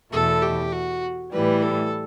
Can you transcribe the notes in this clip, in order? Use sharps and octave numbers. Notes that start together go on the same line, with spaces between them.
E2 B2 A3 A4
G4
F#4
A2 E3 G3 B4
A4